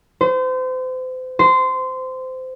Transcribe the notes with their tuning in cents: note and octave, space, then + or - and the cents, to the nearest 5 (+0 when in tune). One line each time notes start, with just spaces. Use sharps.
C5 -35
C5 -20